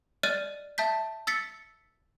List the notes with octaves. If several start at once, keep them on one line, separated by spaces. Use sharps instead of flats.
D5 D#5 F6 F#6 A6 D#7
E5 A5 G6 B6
E6 A6 B6 C#7